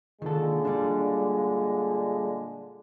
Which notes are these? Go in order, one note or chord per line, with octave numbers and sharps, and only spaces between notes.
A#2 D3 D#3 G#3 A4
G3 D4